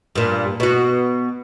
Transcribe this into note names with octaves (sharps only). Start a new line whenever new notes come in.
G2 A#2
B2 F#4